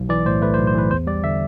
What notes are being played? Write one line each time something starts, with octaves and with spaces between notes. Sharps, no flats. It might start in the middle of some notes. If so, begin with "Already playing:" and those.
Already playing: B1
E3 D5
A2 C5
A3 B4
C5
B1
C5
E3 B4
E2 C5
G3 D5
D3 E5